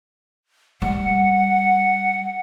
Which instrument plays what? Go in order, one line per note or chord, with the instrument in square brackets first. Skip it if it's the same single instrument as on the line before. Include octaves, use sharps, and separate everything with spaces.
[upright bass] G3 [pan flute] F#5